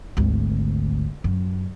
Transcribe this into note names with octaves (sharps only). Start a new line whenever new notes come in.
G#1 D2
F#2